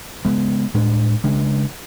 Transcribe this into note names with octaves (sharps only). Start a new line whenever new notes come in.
C#3 G#3 B3
A2 G#3 D4
C#3 G#3 D4